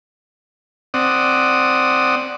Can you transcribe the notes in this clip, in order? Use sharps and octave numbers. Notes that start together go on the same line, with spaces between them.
C4 D5 F#5 D#6